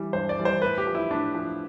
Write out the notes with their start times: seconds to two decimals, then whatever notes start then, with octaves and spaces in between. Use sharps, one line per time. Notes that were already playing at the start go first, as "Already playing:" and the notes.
Already playing: E3 G3
0.13 G2 C5
0.29 D5
0.37 E3 G3
0.45 C5
0.62 A2 B4
0.78 G4
0.87 F3
0.95 E4
1.10 A2 D4
1.34 F3